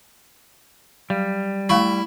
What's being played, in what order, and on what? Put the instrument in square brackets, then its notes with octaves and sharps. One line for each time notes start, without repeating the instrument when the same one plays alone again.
[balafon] F#3 [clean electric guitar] G3
[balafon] A3 F5 C#6 [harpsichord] E4